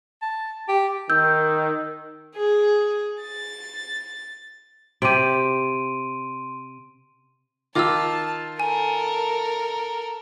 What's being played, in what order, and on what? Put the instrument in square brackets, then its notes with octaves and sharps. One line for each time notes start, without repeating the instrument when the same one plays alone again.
[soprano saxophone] A5
G4
[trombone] D#3 [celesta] E6 G6
[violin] G#4
A6
[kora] C3 G4 [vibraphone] C6 [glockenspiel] D7 D#7
[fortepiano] D#3 F4 [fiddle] A5 [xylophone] D6 E6
[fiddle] A4 A#4 [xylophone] G#5